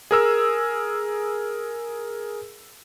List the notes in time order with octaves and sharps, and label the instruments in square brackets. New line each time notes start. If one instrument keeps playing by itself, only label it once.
[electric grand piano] G#4 A#4 E6